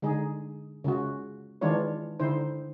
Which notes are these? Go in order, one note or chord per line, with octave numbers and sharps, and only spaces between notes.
D3 G#3 D#4 G#4
C#3 G#3 F4 F#4
D#3 E3 G#3 D4 F4 C#5
D3 D#4 E4 C5